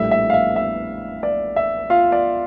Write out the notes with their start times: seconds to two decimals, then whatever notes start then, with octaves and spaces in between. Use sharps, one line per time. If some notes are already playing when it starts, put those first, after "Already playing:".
Already playing: A#1 A2 G3 E5
0.11 E5
0.30 F5
0.34 E5
0.56 E5
1.23 D5
1.56 E5
1.90 F4 F5
2.12 D5